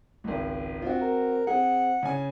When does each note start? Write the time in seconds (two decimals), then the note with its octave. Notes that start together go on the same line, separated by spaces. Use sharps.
0.24 G#1 C#2
0.82 C4 F4 F#4
1.01 A#4
1.47 C4 G#4 F#5
2.03 C#3 G#5